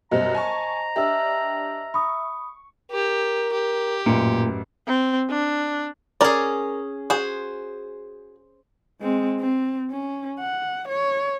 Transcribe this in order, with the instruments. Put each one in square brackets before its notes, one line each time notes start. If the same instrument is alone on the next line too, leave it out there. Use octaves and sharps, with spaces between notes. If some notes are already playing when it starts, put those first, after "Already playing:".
[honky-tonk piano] F#2 B2 G3 [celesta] C5 D#5 [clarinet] A#5
[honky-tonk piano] G#5 A5 C#6
[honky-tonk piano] D4 G4 [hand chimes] E5 E6 F6
[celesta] B5 D#6 [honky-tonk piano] C#6
[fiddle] G4 [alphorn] A#4
[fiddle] G4
[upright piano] A1 F#2 [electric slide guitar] A#2
[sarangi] C4
D4
[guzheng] C#4 G#4 [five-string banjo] A#4 D5
[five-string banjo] F#4 G#4 [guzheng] C5
[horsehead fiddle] G#3 C4
C4
C#4
F#5
C#5